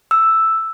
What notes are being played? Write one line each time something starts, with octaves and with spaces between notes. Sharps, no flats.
E6